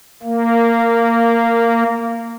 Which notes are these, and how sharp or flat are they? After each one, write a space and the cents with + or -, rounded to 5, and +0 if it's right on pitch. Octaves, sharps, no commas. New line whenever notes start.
A#3 -15